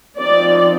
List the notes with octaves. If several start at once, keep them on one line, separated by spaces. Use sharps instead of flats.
F3 C4 D#4 D5